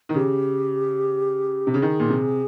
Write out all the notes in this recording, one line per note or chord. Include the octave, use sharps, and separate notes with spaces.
D#3
C#3 G4
C3
C#3
D#3 G#4
A#2
C3